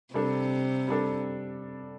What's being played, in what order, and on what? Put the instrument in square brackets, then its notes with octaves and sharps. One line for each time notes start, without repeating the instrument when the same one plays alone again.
[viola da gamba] C3 [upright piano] G3 D4 A4
[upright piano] G3 D4 A4